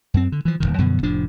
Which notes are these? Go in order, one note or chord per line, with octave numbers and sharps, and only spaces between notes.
F#2 C4
D3
E3 F3
D#1 C2 D#3
F#2 B2 D3 F3
F1 A2 F3 D4